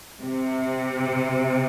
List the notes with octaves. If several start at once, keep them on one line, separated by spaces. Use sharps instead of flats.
C3